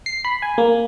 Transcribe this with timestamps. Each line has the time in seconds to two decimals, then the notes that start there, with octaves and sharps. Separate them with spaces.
0.06 C7
0.25 B5
0.42 G#5
0.58 A#3